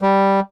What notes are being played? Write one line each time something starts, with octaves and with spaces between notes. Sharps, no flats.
G3